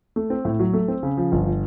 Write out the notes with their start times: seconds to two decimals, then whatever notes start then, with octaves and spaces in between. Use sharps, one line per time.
0.16 A3
0.30 C4
0.45 A2
0.59 F#3
0.73 A3
0.88 C4
1.03 C#3
1.17 F3
1.32 G1